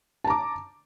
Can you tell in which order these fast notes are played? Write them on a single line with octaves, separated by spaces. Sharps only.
A5 A#5 D6